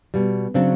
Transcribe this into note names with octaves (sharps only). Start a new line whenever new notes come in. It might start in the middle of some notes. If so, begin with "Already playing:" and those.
B2 G3
C#3 F#3 C4 D4